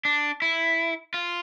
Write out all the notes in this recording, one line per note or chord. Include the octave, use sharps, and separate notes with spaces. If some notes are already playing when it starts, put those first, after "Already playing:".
D4
E4
F4